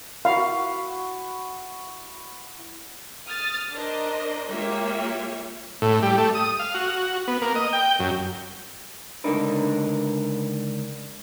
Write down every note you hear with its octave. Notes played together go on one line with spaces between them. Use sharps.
E4 F#4 F5
D#6 F6 A6
D4 A#4 C5 D#5
G#3 A#3 F4 G4 C#5 E5
A2
G3
A3
D#6
F5
F#4
B3
A#3
D#5
G5
F#2
C#2 D3 D4 D#4 A#4 B4